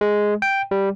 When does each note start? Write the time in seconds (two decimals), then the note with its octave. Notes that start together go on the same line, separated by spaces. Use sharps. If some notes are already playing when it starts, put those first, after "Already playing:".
0.01 G#3
0.42 G5
0.71 G3